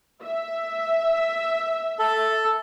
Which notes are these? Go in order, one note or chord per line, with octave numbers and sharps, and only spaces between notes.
E5
A4